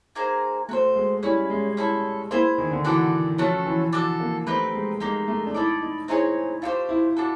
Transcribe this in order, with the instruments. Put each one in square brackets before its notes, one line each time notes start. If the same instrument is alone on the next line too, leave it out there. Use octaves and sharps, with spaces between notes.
[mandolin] A#3 D#4 G#4 C5
[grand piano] A3 [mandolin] F#4 A4 C5
[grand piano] G#3
[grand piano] G3 [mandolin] C#4 E4 G#4
[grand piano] G#3
[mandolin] C#4 E4 A4
[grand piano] A#3 [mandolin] E4 G#4 C5
[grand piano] D#3
D3
[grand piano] E3 [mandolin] F#4 A4 D5 G5
[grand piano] F3 [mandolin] A3 C#4 F#4 A4
[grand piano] E3
[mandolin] D4 F#4 A4
[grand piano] A#3
[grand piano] A3 [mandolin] C4 D#4 G4 B4
[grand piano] G#3
[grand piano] G#3 [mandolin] A#3 D#4 G4
[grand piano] A3
D4
[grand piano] D#4 [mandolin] E4 A4 D5
[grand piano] D#4
[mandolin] C4 D#4 G#4 C#5 [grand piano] E4
[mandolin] A3 D4 G4 C5 [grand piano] F4
[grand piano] E4
[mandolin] D4 F#4 A4